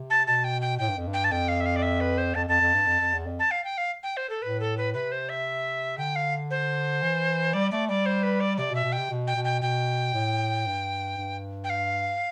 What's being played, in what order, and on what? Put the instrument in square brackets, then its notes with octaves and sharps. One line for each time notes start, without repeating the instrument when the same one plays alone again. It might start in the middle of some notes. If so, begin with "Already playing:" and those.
Already playing: [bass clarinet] C3
[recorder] A5
[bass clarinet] B2 [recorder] A5
[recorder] G5
G5
[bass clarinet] A2 [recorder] G5
[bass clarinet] G2
F2
G2
[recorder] G5
A5
[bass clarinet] F2 [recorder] G5
[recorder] F5
E5
F5
D5
E5
B4
C5
[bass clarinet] F2 [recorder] A5
[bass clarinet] F2 [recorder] A5
[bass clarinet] F2
G2
F2
F2
E2
F2
[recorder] A5
F5
G5
F5
G5
C5
A4
[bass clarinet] A2 [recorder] B4
[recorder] A4
B4
[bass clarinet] C3 [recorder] B4
[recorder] C5
E5
[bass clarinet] D3 [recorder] G5
[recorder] F5
C5
[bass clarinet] E3
[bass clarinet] G3 [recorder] D5
[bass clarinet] A3 [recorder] D5
[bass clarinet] G3 [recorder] D5
[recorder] C5
B4
D5
[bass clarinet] C3 [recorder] D5
[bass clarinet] B2
[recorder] E5
[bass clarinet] B2
[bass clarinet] C3 [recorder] G5
[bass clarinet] B2
[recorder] G5
[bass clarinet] B2
[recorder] G5
[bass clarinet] B2 [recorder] G5
[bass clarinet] A2
G2
G2
[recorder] G5
F5